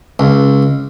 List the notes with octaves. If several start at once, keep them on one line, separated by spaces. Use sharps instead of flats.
C#2